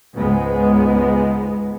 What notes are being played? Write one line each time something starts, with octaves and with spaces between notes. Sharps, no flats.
C#2 G#2 G#3 B3